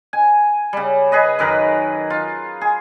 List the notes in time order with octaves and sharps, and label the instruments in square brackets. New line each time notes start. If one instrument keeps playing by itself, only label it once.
[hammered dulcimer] G#5
C#3 G3
G#4 B4 D#5
F#2 D#3 A#4 B4
F4
G#4